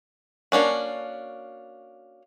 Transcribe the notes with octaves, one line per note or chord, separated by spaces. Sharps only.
A#3 C#4 D4 F#4